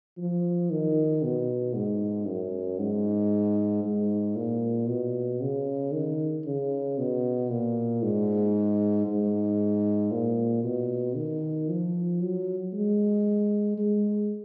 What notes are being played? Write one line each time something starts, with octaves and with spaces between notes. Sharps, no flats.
F3
D#3
B2
G#2
F#2
G#2
G#2
A#2
B2
C#3
D#3
C#3
B2
A#2
G#2
G#2
A#2
B2
D#3
F3
F#3
G#3
G#3